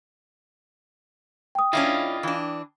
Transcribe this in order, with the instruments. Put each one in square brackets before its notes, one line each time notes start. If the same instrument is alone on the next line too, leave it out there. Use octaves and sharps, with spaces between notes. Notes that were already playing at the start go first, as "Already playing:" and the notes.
[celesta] G5 D#6
[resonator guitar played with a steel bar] C#4 D4 E4 [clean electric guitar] F4 D#5 F5
[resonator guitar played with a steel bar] E3 D4